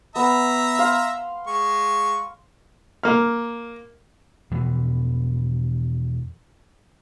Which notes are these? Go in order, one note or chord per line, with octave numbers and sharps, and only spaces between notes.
B3 E5 A#5
F5 C6
G#3 C#6
A#3 F6
E2 B2 E3 F3